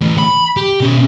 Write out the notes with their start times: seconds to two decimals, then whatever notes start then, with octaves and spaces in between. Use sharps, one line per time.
0.01 E3 A3
0.18 B5
0.57 G4
0.80 B2 C#4